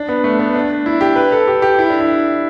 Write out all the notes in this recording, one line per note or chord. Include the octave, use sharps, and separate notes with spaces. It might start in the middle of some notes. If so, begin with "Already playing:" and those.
Already playing: D4
B3
A3
B3
D4
E4
G4
B4
A4
G4
G4
E4
D4
E4